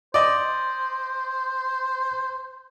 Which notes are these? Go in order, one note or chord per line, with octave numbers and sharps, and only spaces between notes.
C5 D5 D#5